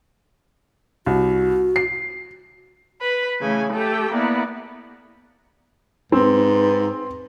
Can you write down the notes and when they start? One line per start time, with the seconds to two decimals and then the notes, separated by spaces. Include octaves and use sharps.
1.06 C2 F#4
1.76 C7
3.00 B4
3.40 C#3 E3 A3 G#5
3.72 A3 G4 A4 G5
4.11 A#3 B3 E4 D5
6.12 G#2 C4 B4